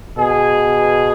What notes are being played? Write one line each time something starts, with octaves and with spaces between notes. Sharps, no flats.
B2 G#4